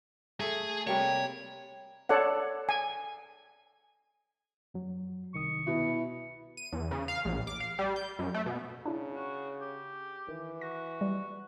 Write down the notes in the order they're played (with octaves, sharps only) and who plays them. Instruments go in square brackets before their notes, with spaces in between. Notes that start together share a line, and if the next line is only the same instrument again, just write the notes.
[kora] A3 A4 [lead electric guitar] G#4
[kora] C3 G3 A#3 [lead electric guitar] C#5
[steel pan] A4 C#5 D5 F#5
G#5
[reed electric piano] F#2 F#3
[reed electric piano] C2 D#3 D#6 [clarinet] C#6
[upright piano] B2 [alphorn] E4
[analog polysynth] D#7
E2
C#3
F5
A#1
D6
F5
G3
G6
F#2
A3
B2
[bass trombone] C#3 [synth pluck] D4 E4
[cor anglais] F#4
G4
[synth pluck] D#3 [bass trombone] E3
[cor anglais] F#4 [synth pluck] A#6
[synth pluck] G3